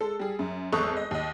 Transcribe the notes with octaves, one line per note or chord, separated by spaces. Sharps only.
G#3 A4
G3 G#4
F#2
G#1 E2 A4 C#6 D#6 F#6
D#5
D#2 D#5